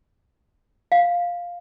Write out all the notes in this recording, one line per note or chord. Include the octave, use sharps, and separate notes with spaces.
F5